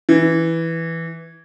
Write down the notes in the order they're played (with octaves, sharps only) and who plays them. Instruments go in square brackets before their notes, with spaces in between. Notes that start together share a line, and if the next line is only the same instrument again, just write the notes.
[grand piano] E3